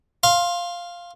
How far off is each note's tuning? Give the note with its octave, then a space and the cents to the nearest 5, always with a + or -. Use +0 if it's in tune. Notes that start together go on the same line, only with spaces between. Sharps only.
F5 +0 C6 +20